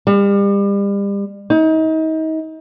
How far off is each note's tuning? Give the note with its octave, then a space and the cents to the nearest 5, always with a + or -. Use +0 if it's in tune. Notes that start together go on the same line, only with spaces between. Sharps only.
G3 +35
D#4 +35